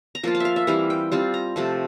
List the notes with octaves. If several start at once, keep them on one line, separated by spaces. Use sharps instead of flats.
A#5
F3 A#3 F4 A5
A5
E5 F5
E5
E3 G3 C4 E4 F5
G5
G3 C4 F4 A5
A#5
C3 F3 A3 A5